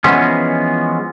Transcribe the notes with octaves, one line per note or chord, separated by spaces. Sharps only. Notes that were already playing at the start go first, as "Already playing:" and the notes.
E3 F3 G#3 B3 C#4